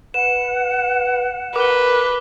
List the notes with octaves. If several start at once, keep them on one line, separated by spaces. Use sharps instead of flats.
B4 F#5 E7
A#4 B4 D6 G7